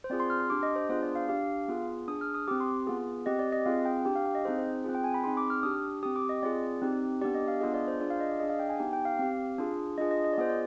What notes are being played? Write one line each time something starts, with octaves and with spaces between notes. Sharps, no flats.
C5
C4 F4 G#4 D5
C6
F6
C6
D4 G4 D6
D#5
C5
B3 D4 F4 G#4 C5
D5
F5
D4 G4 F5
B3 F4 G#4
D4 G#4 D#6
F6
D#6
C4 G4 D6
C6
B3 F4 G#4
C4 G4 D#5
D5
D#5
C4 F4 G#4 F5
G5
D4 G4 G5
F5
F5
D#5
C4 D#4 G#4 C5
C5
C4 F4 G#4
G5
G#5
B5
C4 D#4 G#4 C6
D6
F6
D4 G4 D#6
C4 G4 D#6
D6
D#5
C4 F4 G#4 D5
C4 D#4 G4
B3 D4 G4 D5
D#5
F5
B3 D4 F4 G#4 D#5
D5
C5
D4 F4 G#4 D5
F5
D#5
D5
D4 G#4 D#5
F5
G5
G#5
B3 D#4 G4 G5
G5
F5
C4 G4
D4 F4 G#4
D4 F4 G#4 D#5
D#5
D#5
D5
B3 F4 G#4 C5
D5